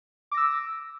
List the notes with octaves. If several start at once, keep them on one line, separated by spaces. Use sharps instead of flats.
D6 E6 A#6